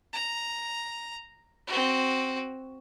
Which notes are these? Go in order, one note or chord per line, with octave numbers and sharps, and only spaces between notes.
A#5
C4 F#4